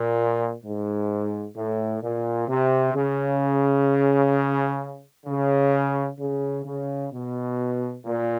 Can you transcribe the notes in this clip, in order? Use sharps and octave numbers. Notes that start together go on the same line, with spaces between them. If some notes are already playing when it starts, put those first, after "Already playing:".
Already playing: A#2
G#2
A2
A#2
C3
C#3
C#3
C#3
C#3
B2
A#2